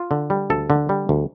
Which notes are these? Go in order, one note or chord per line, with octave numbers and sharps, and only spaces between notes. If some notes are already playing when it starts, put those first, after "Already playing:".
Already playing: F4
D3
G3
D2 A4
D3
G3
D2